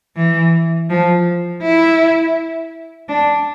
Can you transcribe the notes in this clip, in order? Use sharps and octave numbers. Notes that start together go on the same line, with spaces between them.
E3
F3
E4
D4